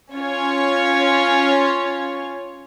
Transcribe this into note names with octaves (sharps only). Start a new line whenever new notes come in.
C#4 F4 C#5